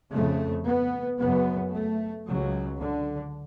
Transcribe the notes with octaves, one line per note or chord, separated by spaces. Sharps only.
F2 C#3 A3
B3
F#2 C#3 B3
A3
C#2 C#3 F#3
D3